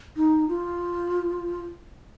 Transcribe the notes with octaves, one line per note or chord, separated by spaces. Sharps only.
D#4
F4